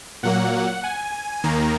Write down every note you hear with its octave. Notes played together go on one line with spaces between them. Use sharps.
A#2 F#3 A#3 F#5
G#5
D#2 D#3 A#3 A#5